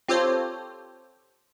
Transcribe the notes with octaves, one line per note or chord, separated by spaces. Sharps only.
C4 F4 G4 A4 C5 C#5